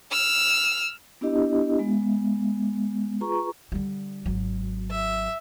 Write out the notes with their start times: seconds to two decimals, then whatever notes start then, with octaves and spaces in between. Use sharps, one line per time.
0.11 E6 F6
1.21 B3 D4 E4 G4 D#5
1.79 G#3 B3
3.21 F4 G#4 B4 A#5 C#6
3.72 D3 G3
4.26 G#1 F#3
4.90 E5